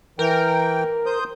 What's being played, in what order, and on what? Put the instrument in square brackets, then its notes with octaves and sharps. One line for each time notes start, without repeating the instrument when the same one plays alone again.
[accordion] E3 G5 [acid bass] A#4
[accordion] C5 D#6 G6